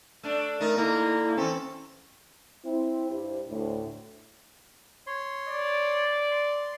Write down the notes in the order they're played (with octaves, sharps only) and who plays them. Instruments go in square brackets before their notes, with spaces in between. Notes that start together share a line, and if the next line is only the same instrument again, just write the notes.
[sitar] A3 D4
[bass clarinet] A3 [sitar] D#4 [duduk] A#4
[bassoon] D3 [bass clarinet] A#3 [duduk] E4
[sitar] E3 A4 [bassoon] C4 [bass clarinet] C#4
[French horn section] C4 E4
G2 E4 G4 C5
D2 A2
[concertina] C#5 C6
[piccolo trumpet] D5
[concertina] C6